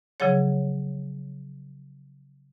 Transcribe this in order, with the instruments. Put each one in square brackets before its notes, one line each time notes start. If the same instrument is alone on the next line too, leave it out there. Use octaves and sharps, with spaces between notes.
[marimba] C#3 F3 F#3 G#4 C#5